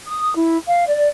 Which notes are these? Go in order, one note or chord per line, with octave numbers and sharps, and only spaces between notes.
D#6
E4
F5
D5